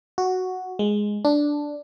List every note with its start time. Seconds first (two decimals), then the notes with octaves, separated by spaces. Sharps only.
0.18 F#4
0.79 G#3
1.25 D4